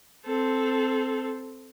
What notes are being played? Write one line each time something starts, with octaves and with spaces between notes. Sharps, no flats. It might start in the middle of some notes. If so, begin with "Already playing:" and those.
C4 A4